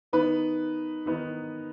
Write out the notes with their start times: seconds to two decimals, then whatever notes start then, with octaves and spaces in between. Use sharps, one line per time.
0.13 D#3 B3 D#4 B4
1.06 D#3 B3 D#4